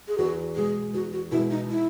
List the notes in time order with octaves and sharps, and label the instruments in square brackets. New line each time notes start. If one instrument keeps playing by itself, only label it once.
[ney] G#4
[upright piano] E2 [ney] F#4
[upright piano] B2 G#3 [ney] G#4
[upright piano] E2 [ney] F#4
[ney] F#4
[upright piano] B2 G#3 [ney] E4
[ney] D#4
E4